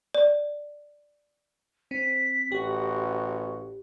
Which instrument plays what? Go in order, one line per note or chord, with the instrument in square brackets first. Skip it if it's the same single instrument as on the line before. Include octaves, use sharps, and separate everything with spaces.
[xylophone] D5
[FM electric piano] C4 [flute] B6
[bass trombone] A1 [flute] F#4 [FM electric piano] G4